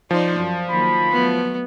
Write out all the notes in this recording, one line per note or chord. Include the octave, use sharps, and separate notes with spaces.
F3 D#4 C5 D5
F#2
D#3 F#3 A#3 B5
F#3 A3 B3